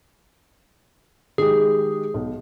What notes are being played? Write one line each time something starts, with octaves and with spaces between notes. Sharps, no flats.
D#3 G#3 G4 G#4
B1